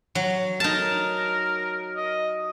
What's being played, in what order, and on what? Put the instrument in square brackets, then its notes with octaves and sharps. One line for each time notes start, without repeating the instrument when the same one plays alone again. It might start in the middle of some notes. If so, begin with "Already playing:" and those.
[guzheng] F#3
[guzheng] D#4 A5 [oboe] A#4
[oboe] D#5